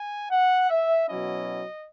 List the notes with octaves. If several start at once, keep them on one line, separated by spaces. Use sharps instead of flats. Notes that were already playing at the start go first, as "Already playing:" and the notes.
Already playing: G#5
F#5
E5
B2 F#3 C#4 E4 D#5